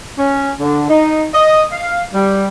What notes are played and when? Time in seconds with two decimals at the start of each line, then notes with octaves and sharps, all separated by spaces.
0.18 C#4
0.60 D3
0.90 D#4
1.34 D#5
1.72 F5
2.14 G3